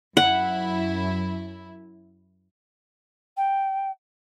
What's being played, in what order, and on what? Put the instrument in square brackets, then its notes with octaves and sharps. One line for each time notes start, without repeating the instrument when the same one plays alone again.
[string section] F#2 E4 [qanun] F#5
[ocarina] G5